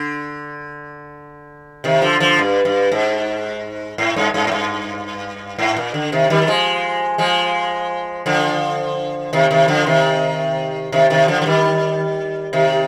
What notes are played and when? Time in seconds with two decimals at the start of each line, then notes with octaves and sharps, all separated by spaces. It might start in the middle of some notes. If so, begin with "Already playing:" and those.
Already playing: D3
1.84 C3 D#3
2.02 D3 F3
2.20 D3 F3
2.39 G2
2.65 G2
2.92 G#2
3.98 G#2
4.16 G2
4.34 G2
4.47 G#2
4.52 G2
5.59 G#2
5.77 A#2
5.94 D3
6.12 C3 D#3
6.30 D#3 G3
6.42 G3
6.47 F3 G#3
7.18 F3 G#3
8.26 D3 F3
9.33 C3 D#3
9.50 C3 D#3
9.68 D3 F3
9.86 C3 D#3
10.92 C3 D#3
11.10 C3 D#3
11.28 D3 F3
11.41 F3
11.46 D#3 G3
12.53 C3 D#3